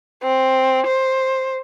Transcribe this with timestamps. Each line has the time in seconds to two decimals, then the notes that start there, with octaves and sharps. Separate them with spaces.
0.23 C4
0.87 C5